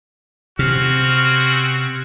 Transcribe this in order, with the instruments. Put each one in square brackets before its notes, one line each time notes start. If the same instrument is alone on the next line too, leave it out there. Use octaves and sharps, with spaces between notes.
[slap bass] C3 [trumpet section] C4 C#4 F#4 [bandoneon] F6